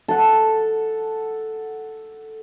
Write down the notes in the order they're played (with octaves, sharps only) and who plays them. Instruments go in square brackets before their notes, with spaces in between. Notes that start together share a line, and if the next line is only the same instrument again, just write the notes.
[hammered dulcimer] A4 F#5